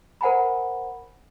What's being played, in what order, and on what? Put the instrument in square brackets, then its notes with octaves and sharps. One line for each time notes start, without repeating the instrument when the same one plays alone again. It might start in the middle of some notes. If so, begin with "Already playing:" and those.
[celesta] A#4 C5 F#5 G#5 A#5 B5